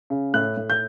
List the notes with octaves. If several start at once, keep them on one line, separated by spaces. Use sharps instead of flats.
C#3
A2 F#6
A2
G6